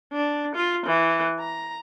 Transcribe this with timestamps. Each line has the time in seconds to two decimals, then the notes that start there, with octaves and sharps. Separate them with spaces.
0.13 D4
0.55 F4
0.86 E3
1.39 A#5